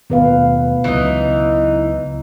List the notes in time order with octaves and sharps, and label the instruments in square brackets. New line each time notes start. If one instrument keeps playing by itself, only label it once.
[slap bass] D#2 B2 A3 [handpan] B3 B4 F5
[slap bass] C#2 C#3 F#3 [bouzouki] E3 D#4